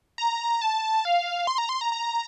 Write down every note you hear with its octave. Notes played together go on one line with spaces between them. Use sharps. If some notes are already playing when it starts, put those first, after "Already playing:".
A#5
A5
F5
C6
A#5
C6
A#5
A#5